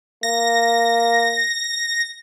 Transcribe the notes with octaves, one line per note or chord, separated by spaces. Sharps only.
A#3 A#6